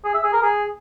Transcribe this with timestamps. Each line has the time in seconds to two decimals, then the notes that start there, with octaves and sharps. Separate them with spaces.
0.05 G#4
0.14 E5
0.24 G#4
0.33 A#4
0.43 G#4